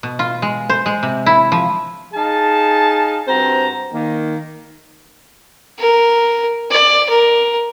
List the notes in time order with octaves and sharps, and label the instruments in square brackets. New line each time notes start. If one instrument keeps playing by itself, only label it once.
[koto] B2
F4
G#3
C5
G#3
C3
E4
F3
[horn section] D#4 G#4 F5 A5
G2 C4 F#4 C5 A#5
D#3 A#3
[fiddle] A#4
D5
A#4